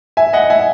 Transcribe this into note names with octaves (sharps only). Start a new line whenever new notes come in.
E5 G#5
D#5 F#5
E5 G#5